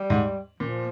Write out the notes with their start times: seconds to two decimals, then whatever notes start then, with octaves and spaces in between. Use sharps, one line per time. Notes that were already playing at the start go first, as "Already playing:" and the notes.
Already playing: G3
0.10 G#2
0.60 A#2 F3